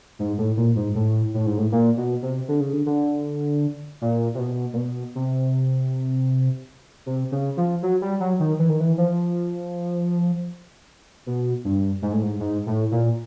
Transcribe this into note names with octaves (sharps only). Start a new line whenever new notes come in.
G#2
A2
A#2
G#2
A2
A2
G#2
A2
A#2
B2
C3
D3
C#3
D3
D3
A#2
C3
B2
A#2
B2
C3
C3
C#3
F3
F#3
G3
F#3
D#3
E3
D#3
E3
F3
B2
G2
G#2
A2
G#2
G#2
A2
A#2